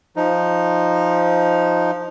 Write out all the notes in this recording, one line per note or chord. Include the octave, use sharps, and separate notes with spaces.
F3 D#4